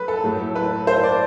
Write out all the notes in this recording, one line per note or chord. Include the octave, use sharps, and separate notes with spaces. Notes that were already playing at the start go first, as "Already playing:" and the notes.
Already playing: F#3 A3 B4
A4
A2 F#3 A3
B4
C5
D5